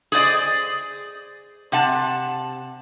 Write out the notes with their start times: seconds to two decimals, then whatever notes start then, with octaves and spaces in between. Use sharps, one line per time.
0.12 G#4 C5 D5 D#5
1.72 C3 F#5 A5